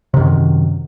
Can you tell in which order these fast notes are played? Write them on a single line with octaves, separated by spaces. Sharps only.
C3 D#3 F#2